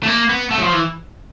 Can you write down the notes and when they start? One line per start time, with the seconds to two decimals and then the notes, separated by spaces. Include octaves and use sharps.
0.03 A3
0.08 A#3
0.29 B3
0.51 A3
0.58 F#3
0.62 F3
0.73 E3